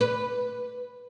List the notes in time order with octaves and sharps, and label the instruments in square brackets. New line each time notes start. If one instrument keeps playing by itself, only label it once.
[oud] B4